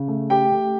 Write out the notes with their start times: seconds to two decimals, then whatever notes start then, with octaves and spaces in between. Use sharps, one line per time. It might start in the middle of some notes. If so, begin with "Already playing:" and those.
Already playing: C#3
0.08 A3
0.30 A3 G4 G5
0.52 A3